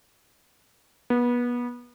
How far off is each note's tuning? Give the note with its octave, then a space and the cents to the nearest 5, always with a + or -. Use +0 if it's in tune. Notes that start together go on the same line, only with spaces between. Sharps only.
B3 -25